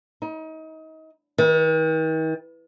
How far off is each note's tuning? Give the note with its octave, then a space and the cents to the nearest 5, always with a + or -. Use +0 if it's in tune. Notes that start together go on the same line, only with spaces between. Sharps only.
D#4 +30
D#3 +45